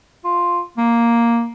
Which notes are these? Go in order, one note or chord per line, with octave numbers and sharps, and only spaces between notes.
F4
A#3